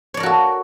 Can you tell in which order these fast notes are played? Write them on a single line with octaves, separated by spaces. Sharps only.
C#5 D5 A#4 F#4 A4